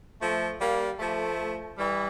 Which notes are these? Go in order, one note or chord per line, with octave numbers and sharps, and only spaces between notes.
F3 A3
G3 A#3
F3 A3
E3 G3